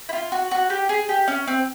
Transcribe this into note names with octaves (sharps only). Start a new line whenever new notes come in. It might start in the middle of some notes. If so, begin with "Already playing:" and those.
E4
F4
F#4
F#4
G4
G#4
G4
C#4
C4